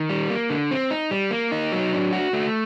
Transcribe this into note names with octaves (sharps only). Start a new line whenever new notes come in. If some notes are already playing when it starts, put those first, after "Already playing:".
Already playing: D#3
G3
A#3
D3
C4
D#4
G3
A#3
D#4
F#3
D4
F#4
A3